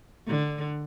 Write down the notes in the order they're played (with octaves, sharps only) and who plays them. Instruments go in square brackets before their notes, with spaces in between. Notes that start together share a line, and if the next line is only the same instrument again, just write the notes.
[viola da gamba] D3